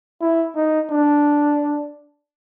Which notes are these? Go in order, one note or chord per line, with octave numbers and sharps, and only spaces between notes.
E4
D#4
D4